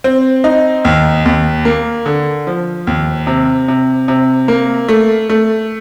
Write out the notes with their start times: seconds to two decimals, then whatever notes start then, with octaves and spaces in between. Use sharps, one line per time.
0.04 C4
0.44 D#4
0.85 D#2
1.25 D#2
1.65 A#3
2.06 D3
2.47 F3
2.87 D#2
3.27 C3
3.68 C3
4.08 C3
4.48 A#3
4.88 A3
5.29 A3